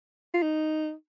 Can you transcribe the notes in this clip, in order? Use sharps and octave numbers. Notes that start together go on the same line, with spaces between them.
F4
D#4